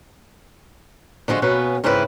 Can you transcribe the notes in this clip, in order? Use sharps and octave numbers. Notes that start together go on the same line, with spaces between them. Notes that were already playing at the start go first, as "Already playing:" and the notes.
D3 F3 G#3 F#4
B2 A#3 B3 C#4 B4
G#2 C#3 C4 E4 B4